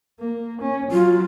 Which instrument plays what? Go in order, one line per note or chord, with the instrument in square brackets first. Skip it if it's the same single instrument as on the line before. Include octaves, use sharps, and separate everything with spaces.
[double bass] A#3
C#4
[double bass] F#3 [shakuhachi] F4